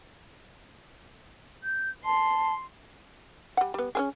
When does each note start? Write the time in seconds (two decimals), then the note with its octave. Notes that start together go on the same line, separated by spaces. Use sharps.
1.64 G6
2.06 A5 C6
3.57 G3 F#5
3.74 G3 B3
3.95 C#4 D4 G#4